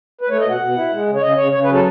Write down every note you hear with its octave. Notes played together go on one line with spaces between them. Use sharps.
B4
A3 C#5
D#5
B2
F#5
B2
E4
G#3
C#3
C#5
C#3 D#5
C#3 C#5
C#3 C#5
B4
F#3
A4